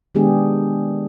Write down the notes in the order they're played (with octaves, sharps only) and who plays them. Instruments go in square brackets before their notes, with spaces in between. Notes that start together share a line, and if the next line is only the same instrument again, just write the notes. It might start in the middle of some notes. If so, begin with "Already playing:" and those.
[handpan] D#3 G#3 B3 D4 G4 G#4